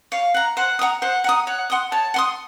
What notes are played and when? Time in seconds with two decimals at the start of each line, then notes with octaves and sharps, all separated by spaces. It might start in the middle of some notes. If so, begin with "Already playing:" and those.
0.12 C#5 F5
0.34 F#5 A#5
0.57 C5 F#5
0.79 F#5 A#5 D#6
1.02 C5 F#5
1.24 F#5 A#5 D#6
1.47 C#5 F#5
1.70 F#5 C6 D#6
1.91 C#5 A5
2.14 F#5 C6 D#6